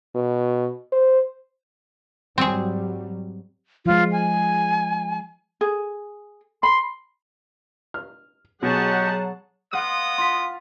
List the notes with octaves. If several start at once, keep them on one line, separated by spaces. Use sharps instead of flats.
B2
C5
G#2 F#3 G3 C4 G#4
F3 G#3 F4
G#5
G#4
B5 C6
F6
B2 F#3 G4 G#4 C#5 D#5 F#5 A5
B3 D#5 F5 F#5 C6 D#6
F4 C6 B6